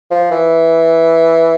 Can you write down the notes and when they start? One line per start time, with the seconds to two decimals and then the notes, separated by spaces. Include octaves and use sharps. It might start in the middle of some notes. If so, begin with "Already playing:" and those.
0.11 F3
0.31 E3